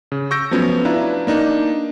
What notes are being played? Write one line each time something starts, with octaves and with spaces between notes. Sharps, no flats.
C#3
C#6 E6 G6 A#6 D7
F3 F#3 A3 B3 C#4
D4 E4 B4 F5 A#5
A#3 D4 D#4